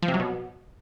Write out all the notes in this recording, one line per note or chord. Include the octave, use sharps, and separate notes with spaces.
F3
C3
F#3
B2